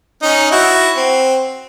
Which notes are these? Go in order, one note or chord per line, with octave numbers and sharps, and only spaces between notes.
C#4 D#4
E4 F#4
C4